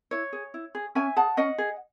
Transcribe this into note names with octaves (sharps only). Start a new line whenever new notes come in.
E4 C#5
G#4
E4
G#4
C#4 E5 G#5
G#4 F#5 A5
C#4 D#5 F#5
G#4